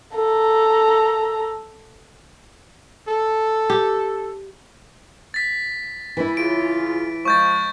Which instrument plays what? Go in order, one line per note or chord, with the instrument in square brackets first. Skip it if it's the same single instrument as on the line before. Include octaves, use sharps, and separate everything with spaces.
[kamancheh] A4 A#5
[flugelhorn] A4
[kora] G4
[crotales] A6 B6
[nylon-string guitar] E3 E4 [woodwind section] B5
[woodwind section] C#3 F4 [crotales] D7
[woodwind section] F3 G#3 [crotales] C#6 G6 A6